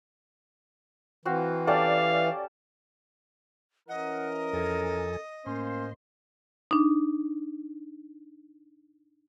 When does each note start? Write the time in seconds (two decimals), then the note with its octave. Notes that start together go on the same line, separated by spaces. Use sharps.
1.25 E3 C4 F#4 F5
1.67 C#4 G4 A4 D5 F5
3.89 E3 C#4 A#4 D#5 F#5
4.53 F2 F3 A4 G#5
5.46 A2 A#3 C#4 C5 C6
6.71 D4 D#4